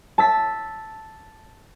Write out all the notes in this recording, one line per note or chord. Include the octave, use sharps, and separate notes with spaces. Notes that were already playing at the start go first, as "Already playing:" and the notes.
A5 E6 B6